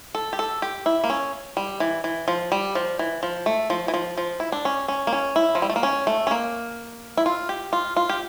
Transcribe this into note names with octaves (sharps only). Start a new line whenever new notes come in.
A4
G4
A4
G4
E4
A#3
C#4
G3
E3
E3
F3
G3
F3
E3
F3
A3
F3
E3
F3
F3
E4
D4
C#4
C#4
A#3
C#4
E4
F3
G3
A3
A#3
C#4
A3
C#4
A#3
E4
F4
G4
F4
F4
G4